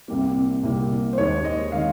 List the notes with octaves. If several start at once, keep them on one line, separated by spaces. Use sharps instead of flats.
C2 C3 G3 A#3
C2 C3 G3 A#3
C5
D#2 D#3 G#3 C#5
D#5
D#3 G#3 F5